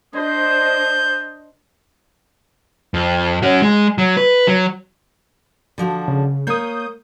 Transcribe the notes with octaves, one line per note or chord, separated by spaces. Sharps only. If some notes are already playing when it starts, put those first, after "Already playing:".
D4 C5 D#5 G6
F2
C#4 F#4
G#3
F#3
B4
F#3
D3 F3 F#4
C#3
A#3 C#5 D#6 G6